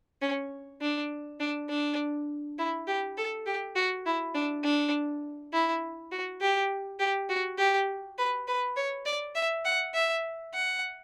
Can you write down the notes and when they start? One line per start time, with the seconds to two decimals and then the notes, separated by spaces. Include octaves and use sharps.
0.22 C#4
0.82 D4
1.40 D4
1.69 D4
2.58 E4
2.87 G4
3.17 A4
3.46 G4
3.75 F#4
4.06 E4
4.35 D4
4.64 D4
5.53 E4
6.12 F#4
6.41 G4
6.99 G4
7.29 F#4
7.58 G4
8.18 B4
8.48 B4
8.76 C#5
9.06 D5
9.35 E5
9.65 F#5
9.94 E5
10.54 F#5